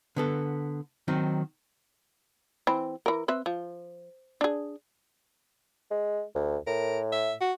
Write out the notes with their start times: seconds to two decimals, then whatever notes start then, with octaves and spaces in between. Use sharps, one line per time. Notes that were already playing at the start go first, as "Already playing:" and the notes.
0.16 D3 B3 A4
1.08 D#3 F#3 C4 D#4
2.67 E3 C4
3.06 E3 A#4
3.28 C4 B4 E5
3.46 F3
4.41 D4 G#4
5.91 G#3
6.35 D2
6.67 A2 A#4
7.12 E5
7.41 F#4